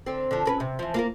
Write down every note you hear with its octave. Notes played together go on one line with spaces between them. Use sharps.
D3 C4
D3 F3
C#4 A#4 B4
C3
E3 F3
A#3 F4 A#4